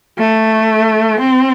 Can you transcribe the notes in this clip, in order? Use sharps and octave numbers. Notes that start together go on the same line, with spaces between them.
A3
C4